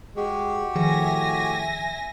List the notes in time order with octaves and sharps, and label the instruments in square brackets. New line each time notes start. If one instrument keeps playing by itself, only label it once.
[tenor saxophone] G#3 [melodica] F#4 G4
[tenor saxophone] A2 [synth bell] D#3 F3 G#4 [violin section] E5 G#5 A#6